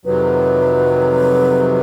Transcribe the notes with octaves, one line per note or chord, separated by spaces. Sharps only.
F2 C3 D#3 F#3 B4